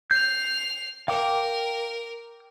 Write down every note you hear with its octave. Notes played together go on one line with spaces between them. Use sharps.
G6 C7 F7
A#4 F5 G5 D6